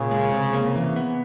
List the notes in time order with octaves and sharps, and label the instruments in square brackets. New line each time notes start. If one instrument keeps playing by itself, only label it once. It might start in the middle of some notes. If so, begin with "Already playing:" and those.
Already playing: [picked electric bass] A#2 [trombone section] C#3
[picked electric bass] G#3
C3
A#3
E3
B3